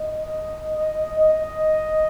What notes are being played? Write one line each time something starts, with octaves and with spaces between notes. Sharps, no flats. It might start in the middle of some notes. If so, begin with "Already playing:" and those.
Already playing: D#5
D#5
D#5